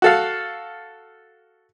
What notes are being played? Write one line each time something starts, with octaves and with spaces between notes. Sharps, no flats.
F#4 A4 F5